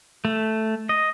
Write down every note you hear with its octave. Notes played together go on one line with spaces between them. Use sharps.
A3
D#5